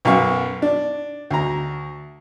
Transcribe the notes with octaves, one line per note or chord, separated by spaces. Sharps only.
B1 F#2 F5 C#6
D4
D2 A#5